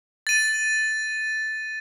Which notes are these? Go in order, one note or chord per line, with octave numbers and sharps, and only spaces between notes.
A6 D#7